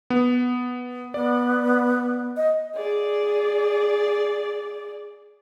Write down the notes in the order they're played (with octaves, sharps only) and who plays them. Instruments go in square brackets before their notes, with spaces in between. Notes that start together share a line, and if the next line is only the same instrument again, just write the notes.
[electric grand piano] B3
[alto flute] B3 [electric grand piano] D5
[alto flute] D#5
[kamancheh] G#4 D5